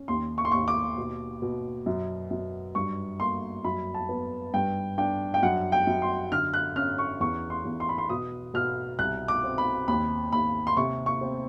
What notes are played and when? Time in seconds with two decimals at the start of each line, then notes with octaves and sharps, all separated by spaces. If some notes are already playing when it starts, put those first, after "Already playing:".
Already playing: C#4
0.08 D#2 C6
0.38 C#6
0.45 C6
0.52 D#2 C#6
0.68 D6
0.98 B2
1.42 B2
1.86 F#2
2.31 F#2
2.75 G2 C#6
3.20 A#3 C6
3.64 F#2 B5
3.94 A5
4.09 B3
4.54 G2 G5
4.98 D4 G5
5.34 G5
5.43 F#2 F#5
5.72 G5
5.87 F#2
6.02 C6
6.32 D3 F6
6.54 F#6
6.76 C#4 F6
6.99 C#6
7.20 E2 C#6
7.50 C6
7.65 E2
7.80 C6
7.89 B5
7.98 C6
8.10 B2 D#6
8.54 B2 F6
8.99 C2 F#6
9.28 D6
9.44 C4
9.58 B5
9.88 D#2 B5
10.32 D#2 B5
10.67 C6
10.77 C3 C#6
11.06 C#6
11.21 C4